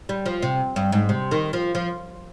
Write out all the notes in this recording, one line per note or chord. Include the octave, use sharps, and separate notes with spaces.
G3
F3
C3
G2
G#2
C3
D#3
F3
F3